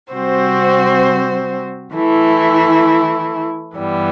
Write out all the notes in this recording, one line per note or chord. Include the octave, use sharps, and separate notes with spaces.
C3 G3 C4 F#4 C5
E3 A3 E4
G2 E3 G3 B3